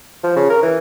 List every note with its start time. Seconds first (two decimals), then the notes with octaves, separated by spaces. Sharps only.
0.23 F3
0.36 C#3
0.50 A#4
0.63 E3